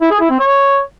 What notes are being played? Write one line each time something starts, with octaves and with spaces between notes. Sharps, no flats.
E4
G#4
E4
C4
C#5